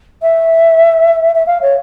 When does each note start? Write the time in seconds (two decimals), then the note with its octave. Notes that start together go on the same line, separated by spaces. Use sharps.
0.22 E5
1.35 E5
1.46 F5
1.61 C#5